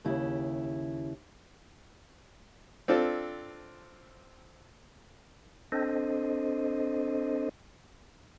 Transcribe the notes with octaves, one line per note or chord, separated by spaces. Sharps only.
D#2 C#3 E4 G4
C4 D4 F4 A4
C4 D4 A4 C5 D#5